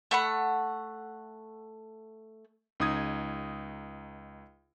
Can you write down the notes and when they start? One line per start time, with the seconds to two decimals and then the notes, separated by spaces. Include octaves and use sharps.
0.11 A3 F#5 B5
2.80 C#2 D#4 D#6 G#6